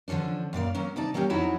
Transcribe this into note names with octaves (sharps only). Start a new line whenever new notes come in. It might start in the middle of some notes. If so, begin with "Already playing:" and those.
D3 F3 F#3 C#4 D4
F#2 A#2 D5 F5
F#3 A#3 C#4
C3 D#4 D5 A5
F#3 G3 A#3 C#4 G4
F2 F#3 D#4 E4 F#4 C#5